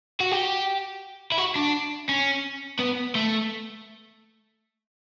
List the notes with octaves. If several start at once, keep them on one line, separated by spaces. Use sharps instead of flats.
F#4
G4
E4
F#4
D4
C#4
B3
A3